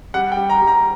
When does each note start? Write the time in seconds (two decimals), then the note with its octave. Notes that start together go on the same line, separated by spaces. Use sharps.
0.14 G3 F#5
0.32 G5
0.37 G3
0.50 A#5
0.62 G3
0.67 A#5